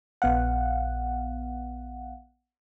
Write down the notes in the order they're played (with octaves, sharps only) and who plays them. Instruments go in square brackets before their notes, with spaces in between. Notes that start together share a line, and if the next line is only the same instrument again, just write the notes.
[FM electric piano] A#1 B3 F5 F#5